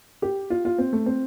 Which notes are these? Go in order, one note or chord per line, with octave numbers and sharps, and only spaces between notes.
G4
F4
F4
C4
A3
C4